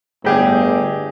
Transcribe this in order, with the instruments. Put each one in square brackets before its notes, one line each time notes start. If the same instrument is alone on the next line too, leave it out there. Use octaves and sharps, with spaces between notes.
[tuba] G1 [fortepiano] A2 G4 G#4